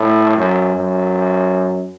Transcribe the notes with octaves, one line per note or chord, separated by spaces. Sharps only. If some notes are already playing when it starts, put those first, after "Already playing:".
Already playing: A2
F#2
F#2